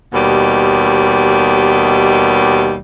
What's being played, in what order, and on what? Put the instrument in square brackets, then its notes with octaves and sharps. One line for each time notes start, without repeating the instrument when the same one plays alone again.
[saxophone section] D#2 B2 G3